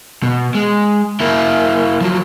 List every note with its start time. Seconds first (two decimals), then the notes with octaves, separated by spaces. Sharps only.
0.23 B2
0.55 G#3
1.20 A#3 E4
2.01 F3 F#3